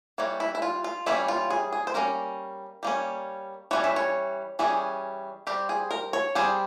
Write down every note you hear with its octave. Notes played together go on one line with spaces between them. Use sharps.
E3 G3 A#3 C#5
E4
E4
F4
F4
E3 G3 A#3 C#4 E4
F4
G#4
G#4
C5
G3 A#3 C#4 A#4
G3 A#3 C#4
E3 G3 C#4 C#5
E5
C#5
E3 G3 C#4 G#4
G3 C4 G4
G#4
A#4
C#5
G3 C4 G#4